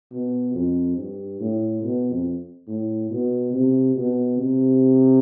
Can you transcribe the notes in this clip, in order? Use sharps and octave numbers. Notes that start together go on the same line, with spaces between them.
B2
F2
G2
A2
B2
F2
A2
B2
C3
B2
C3